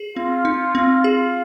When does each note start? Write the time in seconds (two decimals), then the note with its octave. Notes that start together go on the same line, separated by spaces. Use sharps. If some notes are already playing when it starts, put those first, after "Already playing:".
Already playing: G#4
0.16 C4 F4
0.45 D#4
0.75 C4
1.04 F4 G#4